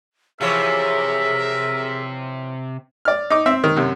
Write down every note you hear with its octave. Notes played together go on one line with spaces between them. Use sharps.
C3 E3 F3 G#4 A#4 C#5 E5
D5 F6
D#4 D6
C4 E5
D#3
F#2 C3